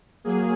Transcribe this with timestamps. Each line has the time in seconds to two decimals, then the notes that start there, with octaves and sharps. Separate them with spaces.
0.24 F#3 A#3 G#4